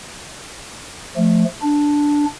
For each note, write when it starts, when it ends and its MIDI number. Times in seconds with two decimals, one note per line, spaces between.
1.17 1.44 53
1.17 1.44 57
1.62 2.25 62